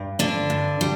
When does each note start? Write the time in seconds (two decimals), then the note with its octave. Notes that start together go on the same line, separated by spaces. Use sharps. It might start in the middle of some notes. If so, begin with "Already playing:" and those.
Already playing: G2
0.19 D3 D4
0.50 G2
0.81 G3